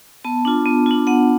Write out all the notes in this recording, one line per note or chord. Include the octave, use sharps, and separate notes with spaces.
B3 A5
D4 F4
B3
D4 F4
B3 F#5